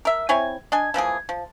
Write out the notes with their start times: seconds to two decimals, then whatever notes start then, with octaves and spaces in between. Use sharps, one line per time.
0.05 A#4 E5
0.29 C4 E4 C#5 G#5
0.72 D4 D#5 G#5
0.94 E3 F3 A#3 G#4
1.29 F3